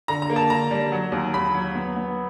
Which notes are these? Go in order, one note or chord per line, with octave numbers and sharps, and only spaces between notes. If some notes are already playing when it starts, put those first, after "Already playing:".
D3 A#5
A#5
A#3
A5
D3 A#5
G3
F#3
D#2
D#2 B5
F#3
B3
B3